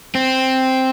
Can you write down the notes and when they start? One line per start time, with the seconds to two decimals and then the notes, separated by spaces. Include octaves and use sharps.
0.15 C4